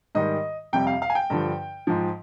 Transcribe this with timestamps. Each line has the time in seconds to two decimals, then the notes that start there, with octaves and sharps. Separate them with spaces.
0.15 G#2 D#3 G3 D#5
0.73 F2 C3 G3 G5
0.87 F5
1.02 F5
1.10 G#5
1.15 G5
1.30 G2 D3 F3
1.87 G#2 F3